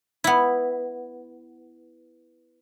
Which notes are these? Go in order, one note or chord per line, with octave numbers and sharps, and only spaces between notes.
B3 E4